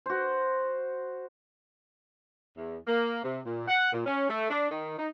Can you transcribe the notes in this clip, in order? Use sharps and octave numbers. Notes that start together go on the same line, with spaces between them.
F#4 C5
E2
A#3
C3
A#2
F#5
A#2
C#4
A3
D4
D#3
D#4